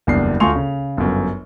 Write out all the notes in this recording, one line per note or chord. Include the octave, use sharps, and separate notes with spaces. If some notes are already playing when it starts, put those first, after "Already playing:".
F#1 E2 G3 D4 C7
D2 F4 G#5 C6 C#6 F7
C#3
G1 F#2